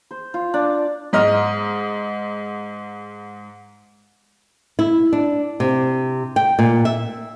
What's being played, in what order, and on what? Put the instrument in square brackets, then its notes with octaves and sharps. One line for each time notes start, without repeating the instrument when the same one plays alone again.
[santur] C5
F4
D4
[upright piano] G#2 D#5 F6
[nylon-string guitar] E4
D4
C3
G5
A#2
E5